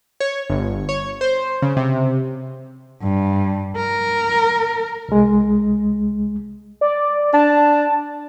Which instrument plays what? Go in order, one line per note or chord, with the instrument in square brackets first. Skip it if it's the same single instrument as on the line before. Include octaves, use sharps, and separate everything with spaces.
[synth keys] C#5
G1
C#5
C5
C#3
C3
[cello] G2
A#4
[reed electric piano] C2 G#3
[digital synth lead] D5
[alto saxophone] D4 [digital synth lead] A5